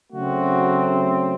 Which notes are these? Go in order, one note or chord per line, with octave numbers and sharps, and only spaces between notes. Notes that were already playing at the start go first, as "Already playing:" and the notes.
C#3 F#3 A3 C4 F#4